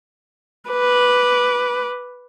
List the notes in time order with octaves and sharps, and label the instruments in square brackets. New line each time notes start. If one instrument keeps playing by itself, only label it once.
[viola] B4 D6